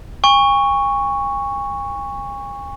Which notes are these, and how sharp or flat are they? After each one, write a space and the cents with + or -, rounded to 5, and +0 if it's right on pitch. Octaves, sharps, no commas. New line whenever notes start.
G#5 -45 C#6 +0